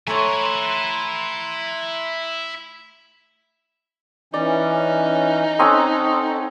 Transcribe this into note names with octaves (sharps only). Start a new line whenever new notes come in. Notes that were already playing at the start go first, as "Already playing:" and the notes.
A3 E4 A4 C#5 G#5 A#5 C6
E3 C#4 D#4 D5
C4 C#4 A4 F#5 A#5 C6 D#6